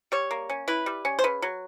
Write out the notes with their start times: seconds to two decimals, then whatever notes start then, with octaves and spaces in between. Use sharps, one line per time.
0.12 G3 C#5
0.31 A#3
0.49 C#4
0.68 E4 B4
0.86 G3
1.05 C#4
1.19 C5
1.24 C#3 B4
1.42 F#3